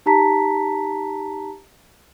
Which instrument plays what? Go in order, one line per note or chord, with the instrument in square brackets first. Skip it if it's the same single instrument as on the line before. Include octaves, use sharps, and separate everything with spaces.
[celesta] D#4 G4 A5 A#5 B6